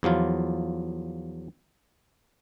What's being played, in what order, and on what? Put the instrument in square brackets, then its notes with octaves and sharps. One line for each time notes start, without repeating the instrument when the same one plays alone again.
[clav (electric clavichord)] E2 F3 F#3 F4